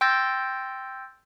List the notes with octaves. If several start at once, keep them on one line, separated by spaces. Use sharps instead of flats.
G5 C6 E6 G6 A6 A#6